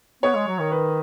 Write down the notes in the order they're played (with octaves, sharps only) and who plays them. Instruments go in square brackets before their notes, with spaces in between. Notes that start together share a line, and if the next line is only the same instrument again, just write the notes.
[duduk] B3 [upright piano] C#5
[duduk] G#3
F#3
D#3
[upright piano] B4